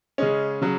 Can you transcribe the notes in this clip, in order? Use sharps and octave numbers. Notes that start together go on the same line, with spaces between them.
C#3 G#3 C#4 D#5
C#3 F#3